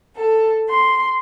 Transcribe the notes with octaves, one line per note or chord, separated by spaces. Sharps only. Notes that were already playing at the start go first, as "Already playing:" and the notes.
A4
C6